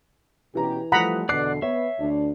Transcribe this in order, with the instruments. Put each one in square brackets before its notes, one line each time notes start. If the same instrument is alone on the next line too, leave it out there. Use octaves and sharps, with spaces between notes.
[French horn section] B2 C#4 G4 [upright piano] E3 A#5
[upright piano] E3 D#6 [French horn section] F3 G3 A3 [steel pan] F#5 A#5 B5
[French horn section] E2 B2 D3 [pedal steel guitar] D5 D6 F#6 [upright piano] C7
[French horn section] B3 [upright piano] C#5 [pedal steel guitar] E5
[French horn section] D2 D4